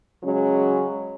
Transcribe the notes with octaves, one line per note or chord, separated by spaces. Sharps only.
C#3 F#3 G#3 C#4